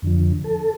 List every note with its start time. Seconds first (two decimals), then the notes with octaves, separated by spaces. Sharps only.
0.02 F2 D3 F3
0.44 A4